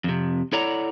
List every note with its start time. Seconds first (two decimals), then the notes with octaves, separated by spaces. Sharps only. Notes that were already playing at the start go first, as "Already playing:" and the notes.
0.04 F2 C3
0.53 E4 A4 C#5 D5 F#5 A#5